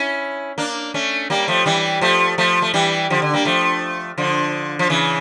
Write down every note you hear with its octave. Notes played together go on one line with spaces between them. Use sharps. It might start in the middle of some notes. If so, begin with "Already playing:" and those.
Already playing: C#4 E4
A#3 D4
A3 C#4
G3 A#3
F3 A3
E3 G3
F3 A3
F3 A3
A3
E3 G3
D3 F3
D3
G3 A#3
F3 A3
D3 F3
F3
C#3 E3